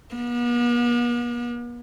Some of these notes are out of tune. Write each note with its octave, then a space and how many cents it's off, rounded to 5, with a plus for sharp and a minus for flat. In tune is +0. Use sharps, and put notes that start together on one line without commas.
B3 -45